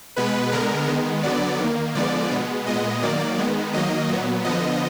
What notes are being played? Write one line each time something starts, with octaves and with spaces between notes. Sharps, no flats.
B2 G#3 B3 B4
D3 G#3 B3 A#4
D#3 G#3 B3
D3 F#3 B3 D5
D#3 A#3
D3 F3 G#3 B3 D5
B2 G#3 B3
A#2 G#3 B3 D#5
D#3 F#3 A#3 D5
D#3 G#3 B3
D#3 F#3 A#3 D#5
A#2 F#3 B3
D3 F3 B3 D#5